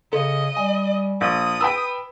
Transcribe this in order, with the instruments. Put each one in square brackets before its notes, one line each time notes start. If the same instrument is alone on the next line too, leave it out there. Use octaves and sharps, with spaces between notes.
[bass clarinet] C#3 [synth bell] A4 [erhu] D#5
[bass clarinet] G3 [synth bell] G#5
[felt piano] A#1 [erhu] D#6
[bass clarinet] B4 [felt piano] G5 B5 E6